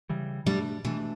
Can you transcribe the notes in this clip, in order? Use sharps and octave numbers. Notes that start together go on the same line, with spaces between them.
C#3 E3 G3
B2 G3 A3 D4
B2 E3 A3 D4